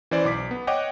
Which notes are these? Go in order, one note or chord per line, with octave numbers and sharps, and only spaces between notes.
E3 C#4 C5 D5
B1 D6 B6
B3
C#5 D#5 F#5 G5 D6